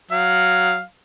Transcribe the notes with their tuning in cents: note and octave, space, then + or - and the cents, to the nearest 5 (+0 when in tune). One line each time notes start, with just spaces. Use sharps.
F#3 +0 F5 +0